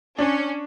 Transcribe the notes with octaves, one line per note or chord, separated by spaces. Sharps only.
C#4 D4